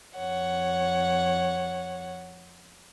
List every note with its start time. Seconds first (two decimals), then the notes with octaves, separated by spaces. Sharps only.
0.16 F2 C#5 F#5